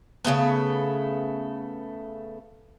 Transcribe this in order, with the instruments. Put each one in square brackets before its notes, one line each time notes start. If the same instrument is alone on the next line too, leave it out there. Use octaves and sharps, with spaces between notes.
[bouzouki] C#3 F#3 A3 B3